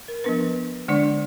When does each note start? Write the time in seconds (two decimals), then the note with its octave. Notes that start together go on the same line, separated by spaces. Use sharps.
0.08 A#4
0.24 F3 B3 D4 B4
0.88 D3 G#3 D4 D5